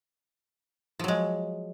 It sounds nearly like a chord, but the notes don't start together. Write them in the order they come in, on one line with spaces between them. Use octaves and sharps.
F3 F#3 G#3